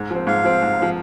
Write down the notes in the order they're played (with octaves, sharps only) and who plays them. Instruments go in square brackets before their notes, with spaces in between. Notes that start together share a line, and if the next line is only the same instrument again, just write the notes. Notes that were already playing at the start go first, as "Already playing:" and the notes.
Already playing: [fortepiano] G#2
F3 C4
[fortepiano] G#2 [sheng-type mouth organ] F5
[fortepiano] F3 C4
G#2
F3 C4